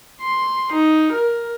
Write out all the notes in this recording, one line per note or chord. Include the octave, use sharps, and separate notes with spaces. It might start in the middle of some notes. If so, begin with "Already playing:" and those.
C6
D#4
A#4